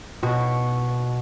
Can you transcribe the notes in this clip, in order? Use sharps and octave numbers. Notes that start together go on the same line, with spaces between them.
B2 F#4